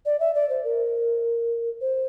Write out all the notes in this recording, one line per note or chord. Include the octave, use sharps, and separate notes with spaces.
D5
E5
D5
C5
A#4
C5